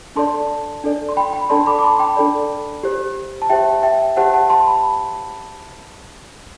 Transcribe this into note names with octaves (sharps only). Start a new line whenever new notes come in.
D4 A4 D5 A5 C6
D4 A4 D5
C6
G5 B5
G5 B5
D4 A4 D5 A5 C6
B5 D6
D6
A5 C6
G5 B5
D4 A4 D5
G4 C5
A5
G4 C5 E5 G5
E5 G5
G4 C5 F#5 A5
F#5 A5
A5 C6
B5